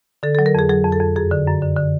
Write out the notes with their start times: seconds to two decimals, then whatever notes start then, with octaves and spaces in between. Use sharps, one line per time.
0.23 D3 A4
0.35 A4
0.39 F#3
0.46 A#4
0.55 F2 G#4
0.69 F#3 G#4
0.84 F2
0.92 A4
1.01 F2
1.16 F#2 G#4
1.31 D3
1.47 F#2
1.62 D3
1.77 D3